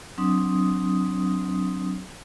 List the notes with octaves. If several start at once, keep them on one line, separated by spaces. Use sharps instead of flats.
F#3 C4 D4 C6 D#6